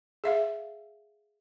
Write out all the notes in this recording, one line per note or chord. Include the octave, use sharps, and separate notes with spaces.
G#4 E5 F5